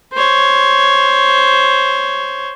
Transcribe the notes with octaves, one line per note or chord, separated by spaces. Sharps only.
C5 C#5